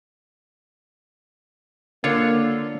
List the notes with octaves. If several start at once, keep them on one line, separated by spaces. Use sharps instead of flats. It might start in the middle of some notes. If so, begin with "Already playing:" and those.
D3 A#3 F4 C#5